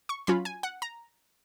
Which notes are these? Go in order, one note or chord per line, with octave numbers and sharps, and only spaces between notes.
C#6
F#3 C#4 F4 B5
G#5
F#5
A#5